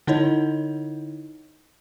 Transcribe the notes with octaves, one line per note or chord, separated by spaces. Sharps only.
D3 D#4 E4 C#5 D#5